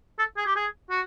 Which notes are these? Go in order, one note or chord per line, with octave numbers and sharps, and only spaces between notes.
A4
G#4
G4
G#4
F#4